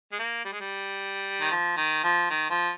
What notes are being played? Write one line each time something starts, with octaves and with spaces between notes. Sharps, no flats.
G#3
A#3
G3
G#3
G3
D#3
F3
D#3
F3
D#3
F3